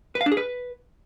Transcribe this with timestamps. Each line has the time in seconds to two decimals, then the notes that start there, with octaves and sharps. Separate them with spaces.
0.15 B4
0.21 F5
0.26 D4
0.32 G#4
0.37 B4